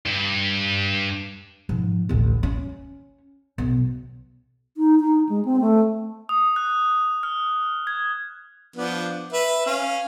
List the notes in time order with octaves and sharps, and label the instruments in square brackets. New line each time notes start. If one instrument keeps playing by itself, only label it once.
[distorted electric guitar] G2
[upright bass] G#2 F3
A1 D2
C#4
B1
[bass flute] D#4
D#4
G#3
C4
A3
[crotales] D#6
F#6
F6
G#6
[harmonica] F3 B3 D4
B4 E5
C#4 F5